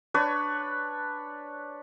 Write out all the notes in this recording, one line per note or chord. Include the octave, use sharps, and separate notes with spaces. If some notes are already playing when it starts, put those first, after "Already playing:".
D4 B4 C#5 D5